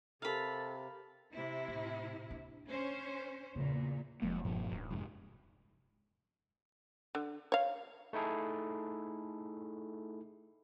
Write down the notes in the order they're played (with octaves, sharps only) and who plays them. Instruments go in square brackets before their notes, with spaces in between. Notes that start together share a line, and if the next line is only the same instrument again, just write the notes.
[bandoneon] C3 [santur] G4 A#4 [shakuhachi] A4 [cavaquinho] F5 B5
[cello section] C3 E4
[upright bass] A2
D4
[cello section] C#4 C5
[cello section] E2 A#2 [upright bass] C#3
[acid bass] F1 [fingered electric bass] F3 G#3 A#3
[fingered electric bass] G2 A#2 F3
[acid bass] D1
[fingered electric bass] F1 G#2
[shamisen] D3
C#5 F5
[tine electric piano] A3 D#4 E4 G#4 A4